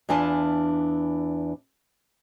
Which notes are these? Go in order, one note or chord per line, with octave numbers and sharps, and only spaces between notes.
E2 E3 D4 F4 G#5 A5